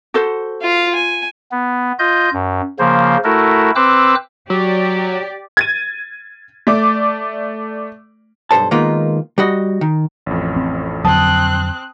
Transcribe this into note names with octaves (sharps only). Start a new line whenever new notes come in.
F#4 A4 C5
F4 F5
G#5
B3
F4 D#5 G6
F#2
C#3 F3 A#3 C5
A3 E4 F#4 A4 A#4
C4 B4 C5 D6 E6 F#6
F#3 G4 D5
G#6 A6 D#7
A3 D5 D6
B1 G2 A4 C5 A5
D#3 G#3 A#3 B3 D#4 F4
G3 F#4 D#5
D#3
A1 F2
C4
F2 D3 F#3 C4 A5 D#6 F#6